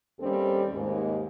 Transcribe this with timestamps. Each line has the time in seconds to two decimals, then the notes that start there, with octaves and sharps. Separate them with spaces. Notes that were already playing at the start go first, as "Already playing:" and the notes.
0.20 D#2 G3 C4 C#4 G4 A4
0.72 D#2 G#2 G#3